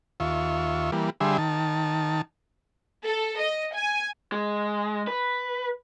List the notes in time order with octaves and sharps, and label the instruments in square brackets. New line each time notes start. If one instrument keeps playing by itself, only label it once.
[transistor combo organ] D#2 F4 E5 C#6
E3 G3 A#3
D3 G3 G#4 E5 C6
D#3 A5
[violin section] A4
D#5
G#5
[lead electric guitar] G#3
B4